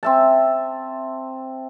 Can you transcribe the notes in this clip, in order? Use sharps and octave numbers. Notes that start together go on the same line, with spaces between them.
C4 E5 A5